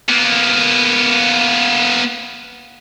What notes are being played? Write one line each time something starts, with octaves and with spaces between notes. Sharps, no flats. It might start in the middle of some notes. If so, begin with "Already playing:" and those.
A#3 B3